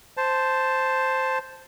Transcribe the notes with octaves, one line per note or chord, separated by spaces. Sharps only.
C5 A5